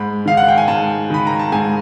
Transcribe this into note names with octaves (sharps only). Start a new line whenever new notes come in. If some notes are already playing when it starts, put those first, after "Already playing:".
Already playing: G#2 B5
D#3 F5
F#5
G5
G#5
G#2 A5
D#3 B5
A#5
A5
G#2 G#5